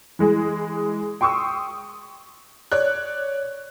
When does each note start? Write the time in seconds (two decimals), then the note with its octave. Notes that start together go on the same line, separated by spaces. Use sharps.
0.19 E3 G#3 G#4
1.21 G5 C6 C#6 D#6 E6
2.72 C#5 D5 F#6